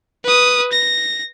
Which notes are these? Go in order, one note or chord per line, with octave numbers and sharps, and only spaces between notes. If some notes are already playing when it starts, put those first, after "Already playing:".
B4 D#6
A#6